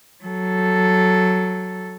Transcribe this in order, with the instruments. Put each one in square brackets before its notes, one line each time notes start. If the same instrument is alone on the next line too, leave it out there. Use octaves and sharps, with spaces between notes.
[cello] F#3 A4